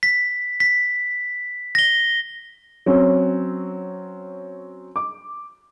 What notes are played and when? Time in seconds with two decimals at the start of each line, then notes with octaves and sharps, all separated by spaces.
0.03 B6
0.60 B6
1.75 A#6 G7
2.86 F#3 C4 C#4
4.96 D6